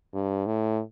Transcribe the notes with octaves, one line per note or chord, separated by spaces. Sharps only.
G2
A2